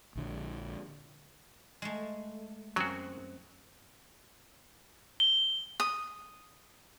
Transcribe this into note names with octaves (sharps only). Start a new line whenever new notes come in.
A#1 D3
G#3 A3
F#2 F#3 C4 F#4 G#4
G7
D#6